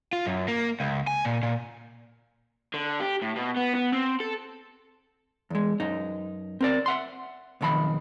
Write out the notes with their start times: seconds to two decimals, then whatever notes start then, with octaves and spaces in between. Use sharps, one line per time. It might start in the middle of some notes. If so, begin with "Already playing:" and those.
0.13 F4
0.26 F#2
0.48 A#3
0.80 C#2
1.07 G#5
1.25 A#2
1.43 A#2
2.74 D3
3.00 G4
3.22 A2
3.36 B2
3.57 B3
3.75 B3
3.92 C4
4.20 A4
5.50 E2 G#3
5.80 F#2 D#4
6.61 C4 A#4 D5
6.86 E5 F#5 C6
7.61 B1 F2 D#3 A#5 B5